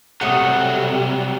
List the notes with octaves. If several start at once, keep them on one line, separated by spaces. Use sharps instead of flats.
C3 F#3 G3 A3 C#5 F#5 D#6